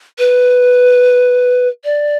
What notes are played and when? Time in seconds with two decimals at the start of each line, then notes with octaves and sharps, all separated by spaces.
0.19 B4
1.85 D5